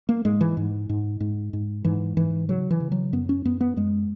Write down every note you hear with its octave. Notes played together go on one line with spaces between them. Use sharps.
A#3
G#2 G#3
E3
G#2
G#2
G#2
G#2
G#2 E3
G#2 E3
C#3 F#3
E3
C#3
F#3
F#2 B3
C#4
F#2 B3
B3
F#2 G#3